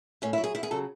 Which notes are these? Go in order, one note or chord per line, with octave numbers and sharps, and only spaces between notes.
A2 C#4
E4
F#3
G#4
E2 E4
G#4
C#3 F#3 A4